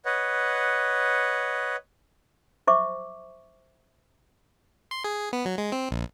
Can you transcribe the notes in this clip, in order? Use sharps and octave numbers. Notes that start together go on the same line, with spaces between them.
B4 C#5 D#5 F#5
C5 E5 C#6 D6
C6
G#4
B3
F#3
G#3
C4
A#1